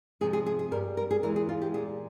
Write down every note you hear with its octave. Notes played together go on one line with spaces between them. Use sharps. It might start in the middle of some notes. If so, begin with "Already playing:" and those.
F2 C3 F3 G#3 G#4
G#4
G#4
G#4
G2 G3 A#4
A#4
G#4
E2 E3 G#3 A#4
G#4
F4
G4
A#2 G#3 G#4